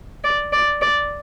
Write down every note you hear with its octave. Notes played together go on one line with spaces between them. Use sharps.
D5
D5
D5